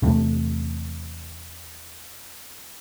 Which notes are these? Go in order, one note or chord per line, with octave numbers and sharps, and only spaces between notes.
E2 C3 A3